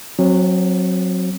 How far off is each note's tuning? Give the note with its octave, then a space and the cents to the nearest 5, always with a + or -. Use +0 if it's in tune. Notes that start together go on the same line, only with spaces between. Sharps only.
F#3 -10 C4 +20